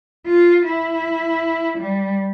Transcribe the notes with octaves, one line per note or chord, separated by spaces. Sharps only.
F4
E4
G3